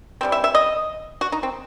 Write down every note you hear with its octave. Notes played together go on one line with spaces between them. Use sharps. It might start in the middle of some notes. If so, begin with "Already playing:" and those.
E3 G3 C4
E5
E5
D#5
F#4
D#4
C4